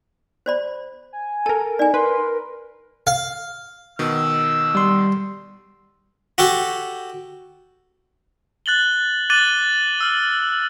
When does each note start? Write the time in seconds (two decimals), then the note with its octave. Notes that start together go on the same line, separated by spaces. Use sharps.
0.46 C5 D5 B5
1.13 G#5
1.46 A4 A#4 A5
1.79 D#4 D5 G#5
1.94 A#4 B4 C6
3.07 F5
3.99 B2 D#3 E6
4.75 G3 C6
6.38 F#4 G4 A4
8.66 F#6 A6 F#7 G7
9.30 D6 F#6 A6 D#7 F#7 G7
10.01 E6 F6